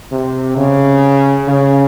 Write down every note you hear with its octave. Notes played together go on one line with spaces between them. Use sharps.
C3
C#3
C#3